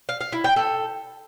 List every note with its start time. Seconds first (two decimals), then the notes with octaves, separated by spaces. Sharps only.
0.09 F5
0.21 F5
0.33 E4
0.44 G5
0.56 A4